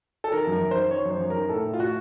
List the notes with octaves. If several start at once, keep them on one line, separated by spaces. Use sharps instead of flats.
A4
D#3 A#4
F#2
A#4
F#2
D#3 C5
D#3 C#5
F#2
C5
F#2
A#4
D#3
A2 A4
A2
F4
A2 F#4